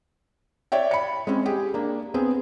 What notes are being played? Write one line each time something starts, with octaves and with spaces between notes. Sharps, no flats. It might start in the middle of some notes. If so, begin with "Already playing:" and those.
C#5 D5 E5 G5
B5 C#7
G#3 C4 C#4
G4 G#4
A#3 D4
B3 C4 G#4